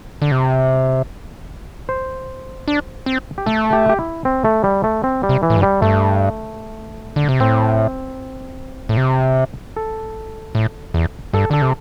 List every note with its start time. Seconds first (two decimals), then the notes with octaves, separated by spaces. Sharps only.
0.22 D3
0.31 C3
1.89 C5
2.68 D4
3.06 C4
3.38 G4
3.46 A3 A4
3.73 G4
3.89 G4
3.99 E4
4.25 C4
4.44 A3
4.64 G3
4.84 A3
5.04 C4
5.23 G3
5.29 C3
5.43 E3
5.50 A2
5.56 G2
5.63 G3
5.82 G2 A3
7.16 D3
7.29 C3
7.40 A2 C4
8.89 A2
8.97 C3
9.77 A4
10.55 A2
10.94 E2
11.33 G2 A4
11.51 D3 A4
11.62 C3